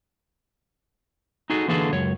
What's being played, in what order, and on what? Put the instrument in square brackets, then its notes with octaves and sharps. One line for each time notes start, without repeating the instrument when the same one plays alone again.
[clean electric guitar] D#4 F#4 G#4 A4
D3 E3 A#3 F#4 G#4 A4
C#2 F#2 C#5